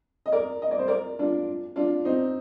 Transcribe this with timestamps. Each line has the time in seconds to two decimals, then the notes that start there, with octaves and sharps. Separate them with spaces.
0.26 D#5
0.32 A#4 D5
0.62 D#5
0.71 D5
0.79 C5
0.88 A#4 D5
1.19 D4 F4
1.76 D4 F4
2.05 C4 D#4